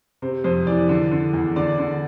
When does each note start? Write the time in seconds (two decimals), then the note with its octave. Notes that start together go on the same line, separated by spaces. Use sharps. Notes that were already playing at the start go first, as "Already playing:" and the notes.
0.22 C3 C5
0.44 F2 C5
0.67 E3 D5
0.89 D3
1.11 D3
1.33 E2
1.56 D3 D5
1.78 D3